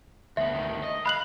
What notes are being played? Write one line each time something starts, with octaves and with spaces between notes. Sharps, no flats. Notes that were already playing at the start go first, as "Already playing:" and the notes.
D2 B3 E5
D2 D#3
D#5
F5 B5 F#6 F#7